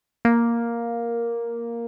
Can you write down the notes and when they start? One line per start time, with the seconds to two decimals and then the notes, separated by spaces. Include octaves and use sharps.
0.25 A#3